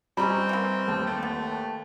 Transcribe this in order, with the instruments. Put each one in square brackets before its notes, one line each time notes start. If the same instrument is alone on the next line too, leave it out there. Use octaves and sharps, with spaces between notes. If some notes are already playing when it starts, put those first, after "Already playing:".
[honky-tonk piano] G3 [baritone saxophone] C4 [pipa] C#4 D#5 B5 [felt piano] A#5 C#6
[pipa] E3 A#3
[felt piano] D#2 A5
[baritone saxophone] A3
[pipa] B3